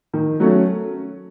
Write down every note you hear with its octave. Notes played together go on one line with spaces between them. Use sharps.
D#3
F#3 A3 C#4